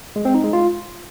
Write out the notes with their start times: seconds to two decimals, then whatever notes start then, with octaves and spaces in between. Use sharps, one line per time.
0.16 G#3
0.25 C4
0.34 D#4
0.44 G#3
0.53 F4